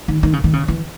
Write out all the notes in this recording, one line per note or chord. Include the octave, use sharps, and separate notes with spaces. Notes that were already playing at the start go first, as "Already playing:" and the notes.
D#3
D#3
C#3
D#3
C#3
E3